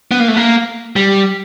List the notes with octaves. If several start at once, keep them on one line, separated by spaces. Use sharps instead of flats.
B3
A#3
A3
A#3
G3